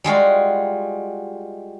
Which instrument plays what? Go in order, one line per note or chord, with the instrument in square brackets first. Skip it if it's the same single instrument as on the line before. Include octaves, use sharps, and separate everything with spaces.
[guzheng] G3 G#3 F4 F#4